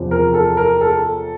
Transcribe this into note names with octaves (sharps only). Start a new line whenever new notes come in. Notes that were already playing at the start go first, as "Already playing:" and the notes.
Already playing: E2 C3 F3
A#4
A4
A#4
A4